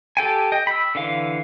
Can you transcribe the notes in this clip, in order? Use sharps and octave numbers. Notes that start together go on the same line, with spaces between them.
G4 A4 G5 G#5
D#5 G5
B5 E6
D3 E3 F5